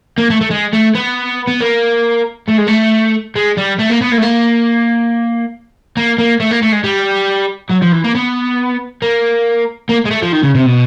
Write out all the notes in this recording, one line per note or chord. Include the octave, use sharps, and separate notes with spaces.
A#3
A3
A3
G#3
A3
B3
B3
A#3
A3
G#3
A3
G#3
G3
A3
A#3
B3
A#3
A3
A#3
A#3
A#3
A3
A#3
A3
G#3
G3
F#3
F3
E3
A#3
B3
A#3
A#3
G#3
A3
F3
D#3
C#3
C3
B2